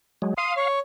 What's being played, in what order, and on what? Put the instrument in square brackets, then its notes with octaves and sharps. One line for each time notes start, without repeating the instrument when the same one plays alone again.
[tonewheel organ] F#3 G#3
[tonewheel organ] F5 [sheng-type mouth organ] C6 D#6
[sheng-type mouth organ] C#5